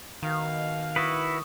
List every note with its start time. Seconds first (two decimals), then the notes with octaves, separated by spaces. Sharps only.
0.23 B2 D#3 F5
0.96 E4 F#4 B4 C#6 D#6